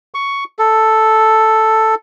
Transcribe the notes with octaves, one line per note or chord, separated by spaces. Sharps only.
C#6
A4